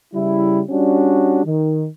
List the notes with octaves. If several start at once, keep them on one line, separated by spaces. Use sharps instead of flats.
C#3 G3 E4
G3 C#4 D4 F#4
D#3